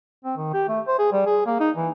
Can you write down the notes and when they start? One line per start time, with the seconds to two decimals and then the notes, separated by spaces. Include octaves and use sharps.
0.25 C4
0.37 D#3
0.53 G4
0.68 A3
0.88 C5
0.99 G#4
1.12 G3
1.26 G#4
1.46 A#3
1.60 D#4
1.77 E3